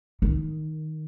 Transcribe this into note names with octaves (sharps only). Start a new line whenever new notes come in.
D#3